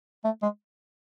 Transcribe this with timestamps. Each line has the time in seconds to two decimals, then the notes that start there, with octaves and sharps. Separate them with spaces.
0.25 A3
0.42 G#3